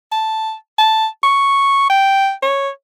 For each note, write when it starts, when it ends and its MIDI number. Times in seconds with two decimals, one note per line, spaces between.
0.12 0.54 81
0.78 1.06 81
1.23 1.89 85
1.90 2.32 79
2.42 2.69 73